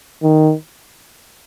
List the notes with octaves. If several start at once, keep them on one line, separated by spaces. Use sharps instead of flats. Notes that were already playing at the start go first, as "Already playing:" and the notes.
D#3